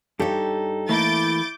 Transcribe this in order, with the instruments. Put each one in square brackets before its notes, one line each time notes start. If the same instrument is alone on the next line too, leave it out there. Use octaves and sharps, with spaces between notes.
[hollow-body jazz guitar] G2 G4 C#5 [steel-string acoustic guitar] D#4 A4
[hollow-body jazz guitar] E3 A3 A#3 [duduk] E4 [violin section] D6 G6 A6